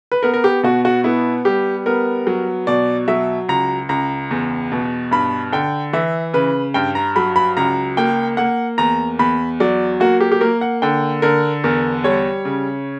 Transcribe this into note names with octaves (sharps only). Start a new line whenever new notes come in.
B4
B3 A#4
A#4
G4
B2 F#4
F#4
B3 E4
G3 G4
B3 A#4
F#3
B2 D5
F#3 E5
C#2 A#5
C#2 A#5
E2
B2
G2 B5
D3 G5
E3 E5
C#3 B4
G2 G5
A#5
F#3 B5
B5
C#2 A#5
A#3 G5
A#3 F#5
E2 A#5
E2 B5
F#3 D5
A#3 F#4
G4
G4
A#3 A#4
F#5
D3 G5
D3 A#4
E2 A#4
G3 C#5
C#3